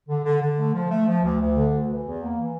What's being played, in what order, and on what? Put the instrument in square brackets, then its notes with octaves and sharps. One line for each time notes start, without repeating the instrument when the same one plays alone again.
[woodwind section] D3
D3
D3
A3
F3
A3
F3
D2
D2
D3
D2
E3
E2
A#3
E3